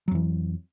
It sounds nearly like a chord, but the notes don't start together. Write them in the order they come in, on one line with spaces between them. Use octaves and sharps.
F#3 F2 E3